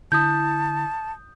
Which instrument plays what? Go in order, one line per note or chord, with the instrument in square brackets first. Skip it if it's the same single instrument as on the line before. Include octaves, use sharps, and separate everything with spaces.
[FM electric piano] D3 E4 [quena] A5 [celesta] D#6 G6